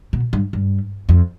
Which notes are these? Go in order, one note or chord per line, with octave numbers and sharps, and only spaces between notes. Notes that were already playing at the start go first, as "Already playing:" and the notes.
B2
G2
G2
F2